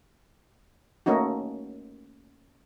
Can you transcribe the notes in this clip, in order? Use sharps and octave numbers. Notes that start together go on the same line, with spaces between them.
A3 A#3 C#4 D#4 F#4